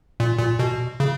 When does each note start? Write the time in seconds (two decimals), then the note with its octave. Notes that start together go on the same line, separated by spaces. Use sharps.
0.20 A#2
0.39 A#2
0.59 B2
1.00 C#3